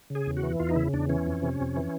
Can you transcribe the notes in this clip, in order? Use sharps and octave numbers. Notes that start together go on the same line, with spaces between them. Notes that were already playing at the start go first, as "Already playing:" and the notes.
C#3
G#4
E2
F#4
E3
E2 F4
D#4
C#3 E4
E2 D4
E3 C#4
F2
C3
F2
E3